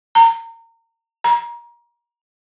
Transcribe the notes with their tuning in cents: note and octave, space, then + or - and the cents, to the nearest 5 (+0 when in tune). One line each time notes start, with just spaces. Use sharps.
A#5 -30
A#5 +25